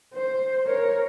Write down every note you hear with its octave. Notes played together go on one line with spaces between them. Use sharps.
C5
A#4 C#5